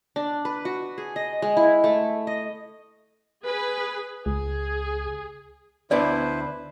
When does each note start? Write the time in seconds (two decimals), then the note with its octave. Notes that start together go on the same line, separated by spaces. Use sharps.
0.16 D4
0.45 B4
0.65 F#4
0.98 G#4
1.16 D#5
1.42 G#3
1.57 E4
1.84 A3
2.27 D#5
3.45 G#4 B4
4.26 C#2 G#4
5.91 D2 B3 D4 E4 B4 C5 D5